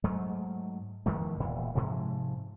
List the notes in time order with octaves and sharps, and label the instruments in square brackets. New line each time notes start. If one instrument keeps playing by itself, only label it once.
[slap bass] G#2 F#3 A3
E2 D#3 F3 A3
E1 A#2 E3
G#2 C3 F3 G#3